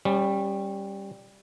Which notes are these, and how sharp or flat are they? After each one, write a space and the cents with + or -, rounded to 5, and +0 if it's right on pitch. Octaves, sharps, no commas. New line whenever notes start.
G3 +5 C#4 -20